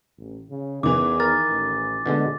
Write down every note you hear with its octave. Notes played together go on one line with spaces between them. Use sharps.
A1
C#3
E2 D#3 E3 D6
A#4 A6
A1
D2 B2 D3 G#3